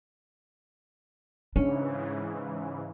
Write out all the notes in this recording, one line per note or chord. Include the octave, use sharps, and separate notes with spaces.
G#2 C#3 E3 C#4 D4